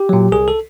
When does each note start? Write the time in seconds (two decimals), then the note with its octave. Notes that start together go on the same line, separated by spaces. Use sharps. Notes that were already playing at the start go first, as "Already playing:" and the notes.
Already playing: G4
0.09 A#2 F#3
0.32 C2 G#4
0.48 A4